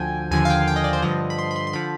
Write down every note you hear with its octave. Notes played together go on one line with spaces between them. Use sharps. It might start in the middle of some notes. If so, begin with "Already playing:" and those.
Already playing: D2 D3 F3 G5 G#5
D#2 D3 F3 G#5
F5
G5
G5
D#5
D5
C5
G2 D3 F3 D#5
B5
C6
B5
C6
C6
D3 F3 B5